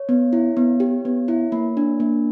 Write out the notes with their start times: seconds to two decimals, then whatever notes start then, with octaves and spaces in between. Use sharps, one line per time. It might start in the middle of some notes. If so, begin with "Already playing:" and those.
Already playing: C#5
0.09 B3
0.33 E4
0.57 B3
0.80 G4
1.05 B3
1.28 E4
1.52 A#3
1.77 D4
2.00 A#3